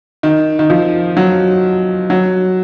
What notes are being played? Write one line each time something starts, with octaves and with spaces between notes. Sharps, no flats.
D#3
D#3
F3
F#3
F#3